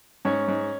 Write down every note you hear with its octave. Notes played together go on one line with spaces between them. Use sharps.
G#2 C#4 C#5
G#2